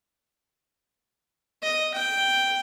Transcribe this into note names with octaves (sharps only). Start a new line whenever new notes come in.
D#5
G5